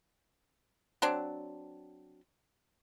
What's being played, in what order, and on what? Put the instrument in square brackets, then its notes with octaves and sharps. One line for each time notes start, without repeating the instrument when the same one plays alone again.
[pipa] F#3 C4 D4